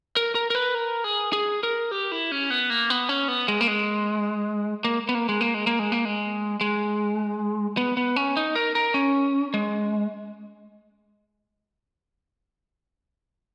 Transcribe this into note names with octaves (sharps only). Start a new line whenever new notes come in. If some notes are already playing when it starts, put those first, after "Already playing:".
A#4
A#4
A#4
B4
A#4
G#4
G#4
A#4
G4
E4
C#4
B3
A#3
B3
C#4
B3
G#3
A#3
G#3
A#3
B3
A#3
G#3
A#3
G#3
A#3
G#3
A#3
G#3
G#3
B3
B3
C#4
D#4
A#4
A#4
C#4
G#3